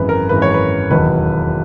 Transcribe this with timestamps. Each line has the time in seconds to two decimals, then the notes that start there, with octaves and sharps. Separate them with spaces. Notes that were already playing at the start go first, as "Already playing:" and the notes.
Already playing: G#1 F#2 E3 G#3 B4
0.09 A#4
0.29 G#1 F#2 E3 G#3 B4
0.42 C#5
0.54 B4
0.90 E1 D#2 D#3 F#3 B4